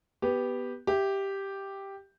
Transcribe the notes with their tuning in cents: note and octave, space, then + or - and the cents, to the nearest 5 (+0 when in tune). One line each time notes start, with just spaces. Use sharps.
B3 +0 G4 +0
G4 +0 E5 +0